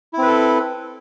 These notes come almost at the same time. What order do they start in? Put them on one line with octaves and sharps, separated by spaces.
E4 C4 B4 A4